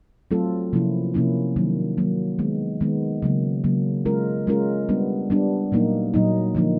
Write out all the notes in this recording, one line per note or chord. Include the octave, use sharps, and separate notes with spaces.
F#3 A3 C4 F4 A4
C3 F3 A#3 C#4 E4
C3 F3 A#3 C#4 E4
D#3 F#3 A#3
D#3 F#3 A#3
D#3 G#3 B3
D#3 G#3 B3
C#3 F#3 A#3
C#3 F#3 A#3
G#3 C#4 F4 A#4
G#3 C#4 F4 A#4
G3 B3 D4
G3 B3 D4
A#2 F#3 A#3 D#4
A#2 F#3 A#3 D#4
D3 F3 A#3 D#4